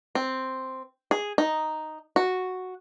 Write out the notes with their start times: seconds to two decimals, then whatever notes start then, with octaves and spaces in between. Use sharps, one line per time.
0.15 C4
1.11 G#4
1.38 D#4
2.16 F#4